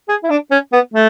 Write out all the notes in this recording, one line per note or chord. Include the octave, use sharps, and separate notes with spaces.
G#4
E4
D4
C#4
B3
A3